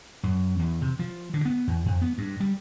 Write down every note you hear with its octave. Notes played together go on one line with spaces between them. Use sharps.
F#2
E2
C3
F3
D3
B3
E2
F2
B3
G2
G3